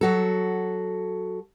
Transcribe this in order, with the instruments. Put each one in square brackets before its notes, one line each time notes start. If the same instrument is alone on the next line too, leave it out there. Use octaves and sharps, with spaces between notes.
[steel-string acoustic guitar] F#3 F#4 A4